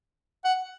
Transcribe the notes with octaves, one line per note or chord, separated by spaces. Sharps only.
F#5